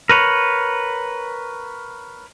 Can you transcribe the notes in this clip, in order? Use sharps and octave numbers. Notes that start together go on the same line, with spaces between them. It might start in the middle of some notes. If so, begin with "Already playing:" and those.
A#4 B4 C#5